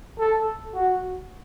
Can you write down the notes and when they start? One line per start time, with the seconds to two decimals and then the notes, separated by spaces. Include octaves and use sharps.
0.19 A4
0.74 F#4